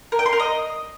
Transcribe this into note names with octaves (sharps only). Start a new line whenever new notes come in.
A#4
G5
C6
A#4
D#5